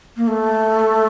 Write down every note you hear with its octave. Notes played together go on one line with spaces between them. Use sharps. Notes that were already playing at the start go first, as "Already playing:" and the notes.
A#3
A3